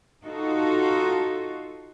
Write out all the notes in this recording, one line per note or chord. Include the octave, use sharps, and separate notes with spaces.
D#4 F4 F#4 A4